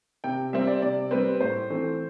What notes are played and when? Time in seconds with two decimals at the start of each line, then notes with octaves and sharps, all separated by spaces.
0.24 C3 G5
0.53 G3 C4 E5
0.67 D5
0.82 C3 D5
1.11 G3 C4 B4
1.41 A2 C5
1.70 E3 A3 C4